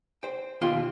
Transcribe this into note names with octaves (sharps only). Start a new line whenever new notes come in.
C5 G5
D#2 B2 F4 G5 C6